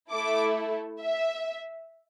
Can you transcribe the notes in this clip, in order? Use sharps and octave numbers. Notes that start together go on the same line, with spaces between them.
A3 E4 A4 D6
E5